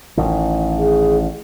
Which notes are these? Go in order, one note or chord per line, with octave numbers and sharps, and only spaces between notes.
A1 D#3
G#4